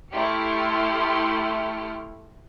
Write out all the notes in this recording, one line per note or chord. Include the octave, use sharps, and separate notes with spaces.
A3 E4 G4 C6 F6 C#7